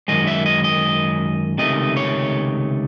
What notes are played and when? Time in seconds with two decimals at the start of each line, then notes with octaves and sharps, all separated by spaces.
0.08 F#2 D#3 G#3 D#5
0.27 E5
0.46 D#5
0.64 D#5
1.58 C#2 C3 D#3 A3 D#5
1.97 C#5